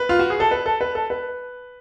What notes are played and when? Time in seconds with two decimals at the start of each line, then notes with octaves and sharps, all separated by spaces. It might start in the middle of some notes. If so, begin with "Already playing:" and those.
Already playing: B4
0.09 F4
0.19 F#4
0.30 G#4
0.40 A4
0.51 B4
0.66 A4
0.81 B4
0.95 A4
1.10 B4